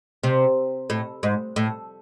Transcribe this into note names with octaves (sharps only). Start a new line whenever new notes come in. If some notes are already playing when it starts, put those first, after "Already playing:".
C3
A2
G#2
A2